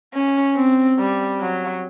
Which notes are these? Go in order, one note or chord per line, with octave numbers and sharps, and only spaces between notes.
C#4
C4
G3
F#3